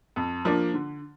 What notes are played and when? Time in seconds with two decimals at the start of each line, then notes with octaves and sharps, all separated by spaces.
0.16 F2
0.45 F3 A#3 D4
0.74 D3